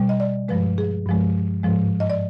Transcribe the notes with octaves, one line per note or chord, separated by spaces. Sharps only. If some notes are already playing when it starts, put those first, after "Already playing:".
Already playing: B2 G3
D#5
D5
G2 F3 G#3 B4
G#4
G2 F3 G#3
G#2 F3 G#3
D#5
D5